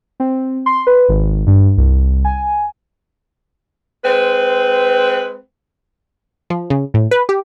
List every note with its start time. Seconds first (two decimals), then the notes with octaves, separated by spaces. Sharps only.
0.20 C4
0.66 C6
0.87 B4
1.09 G#1
1.47 G2
1.77 C2
2.25 G#5
4.04 G#3 C4 B4
6.50 F3
6.70 C#3
6.94 A2
7.11 B4
7.29 G4